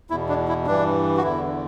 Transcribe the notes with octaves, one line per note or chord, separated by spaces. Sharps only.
E2 B2 E4
D4
E4
G2 E3 D4
F#4
E2 D3 E4